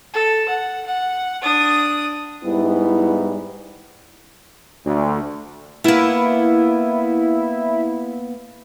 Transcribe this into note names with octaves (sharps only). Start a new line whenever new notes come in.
A4
F#5
F#5
D4 D#6
G#2 G3 B3 E4
D2
A#3 B3 E4